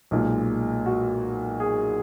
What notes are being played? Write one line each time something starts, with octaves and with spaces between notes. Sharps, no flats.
B1 A#2 G#3
F#4
G#4